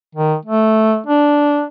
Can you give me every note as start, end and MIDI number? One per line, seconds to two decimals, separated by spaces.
0.15 0.35 51
0.46 0.99 57
1.07 1.64 62